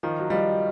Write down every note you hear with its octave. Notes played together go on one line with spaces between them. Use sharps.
D#3 F3 D#5
F#3
F3 G3 D#5